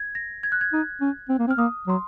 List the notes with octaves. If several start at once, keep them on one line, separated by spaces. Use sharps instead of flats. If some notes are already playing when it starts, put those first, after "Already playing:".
Already playing: G#6
A#6
G#6
F#6
G#6
D#4
C#4
C4
A#3
C4
F6
A#3 D#6
F#3 C6